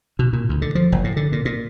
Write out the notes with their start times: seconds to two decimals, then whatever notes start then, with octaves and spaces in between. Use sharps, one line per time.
0.19 B2
0.33 A#2
0.49 D2
0.62 D3
0.75 F3
0.92 F#1
1.04 A2
1.16 D3
1.32 A#2
1.45 A#2